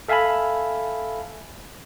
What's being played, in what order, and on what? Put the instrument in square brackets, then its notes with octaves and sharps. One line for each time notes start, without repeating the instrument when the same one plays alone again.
[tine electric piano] A4 E5 F5 G#5 A5 B5